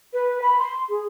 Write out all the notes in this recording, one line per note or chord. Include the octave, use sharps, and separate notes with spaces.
B4
B5
C6
G#4